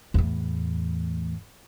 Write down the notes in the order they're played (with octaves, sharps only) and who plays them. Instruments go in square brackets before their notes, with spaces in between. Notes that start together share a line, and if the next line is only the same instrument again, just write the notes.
[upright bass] E2 A2